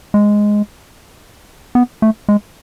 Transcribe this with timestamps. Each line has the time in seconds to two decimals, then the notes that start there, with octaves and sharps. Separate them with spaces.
0.14 G#3
1.75 B3
2.02 A3
2.29 G#3